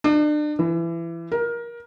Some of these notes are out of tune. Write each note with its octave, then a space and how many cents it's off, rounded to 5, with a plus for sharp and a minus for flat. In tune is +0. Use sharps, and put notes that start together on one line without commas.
D4 +35
E3 +25
A#4 +20